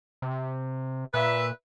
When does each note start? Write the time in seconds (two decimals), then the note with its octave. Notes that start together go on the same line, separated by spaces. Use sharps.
0.22 C3
1.14 A#2 B4 E5